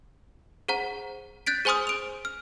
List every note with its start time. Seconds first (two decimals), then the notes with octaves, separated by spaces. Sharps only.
0.68 G#4 C5 F#5 A#5
1.46 F#6 G6 A6 B6 D7
1.65 G#4 C5 G#5 C6 D#6 F6
1.87 D7 F7
2.25 F6